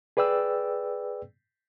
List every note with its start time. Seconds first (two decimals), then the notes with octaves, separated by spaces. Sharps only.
0.17 G#4 B4 D5 G5 E6